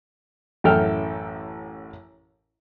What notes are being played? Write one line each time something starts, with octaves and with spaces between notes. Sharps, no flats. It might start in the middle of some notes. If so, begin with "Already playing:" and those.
A1 F#2 E4 A4 G5 F6